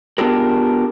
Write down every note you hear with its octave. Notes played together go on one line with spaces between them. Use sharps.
B3 D4 F4 G4 G#4 A#4